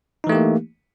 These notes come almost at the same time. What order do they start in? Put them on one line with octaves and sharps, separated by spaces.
D#4 E3 A3 G4 A#3